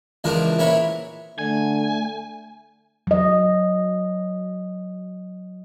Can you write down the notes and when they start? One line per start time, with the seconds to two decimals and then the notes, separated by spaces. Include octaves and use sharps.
0.24 C#2 E3 F3 D4 A#4
0.59 A#1 E3 E4 A#4 C#5 B5
1.39 D3 A3 G#5
3.07 F#3 D#5